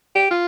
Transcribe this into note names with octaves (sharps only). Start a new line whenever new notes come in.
G4
F4